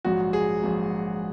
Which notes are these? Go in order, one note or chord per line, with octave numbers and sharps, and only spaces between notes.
A#1 G#2 F#3 F#4
G#4
A#1 G#2 F#3